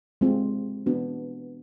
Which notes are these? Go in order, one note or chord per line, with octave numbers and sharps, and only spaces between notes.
G#3 C4 F4
B3 D4 F#4